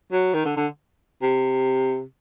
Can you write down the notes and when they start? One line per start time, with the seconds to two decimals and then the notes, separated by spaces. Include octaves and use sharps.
0.12 F#3
0.34 D#3
0.45 D3
0.57 D3
1.22 C3